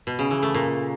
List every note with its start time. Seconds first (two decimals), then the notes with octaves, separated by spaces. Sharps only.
0.07 B2
0.19 C#3
0.31 E3
0.43 A3
0.54 A#2